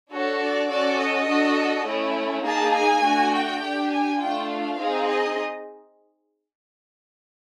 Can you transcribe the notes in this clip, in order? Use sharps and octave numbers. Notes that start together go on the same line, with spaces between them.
D4 F#4 A4 C#5
D5
C#4 F#4 A4 D5
D#5
D4 F#4 A4
A3 C#4 E4
A#3 D#4 G#4 A5
G#5
A3 D4 F#4
G5
D4 G4
G#5
A3 D4 F4 G5
F5
C4 D#4 G#4
D#5